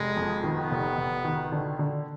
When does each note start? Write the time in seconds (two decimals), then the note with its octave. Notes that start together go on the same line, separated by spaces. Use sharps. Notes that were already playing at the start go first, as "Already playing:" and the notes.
Already playing: F1 G#3
0.17 F2
0.43 D#3 B3
0.71 F1
0.97 F1
1.24 D#3
1.52 D3
1.79 D3